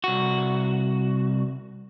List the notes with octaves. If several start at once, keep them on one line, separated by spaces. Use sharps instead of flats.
C2 F#4